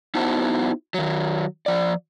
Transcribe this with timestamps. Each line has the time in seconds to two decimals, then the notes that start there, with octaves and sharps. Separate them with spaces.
0.15 B3 D#4 E4 F#4 C5 A5
0.94 D#3 F#3
1.66 F3 D5